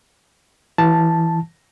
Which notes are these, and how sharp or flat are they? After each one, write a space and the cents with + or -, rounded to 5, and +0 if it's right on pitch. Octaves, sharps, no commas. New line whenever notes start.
E3 +0 A5 +0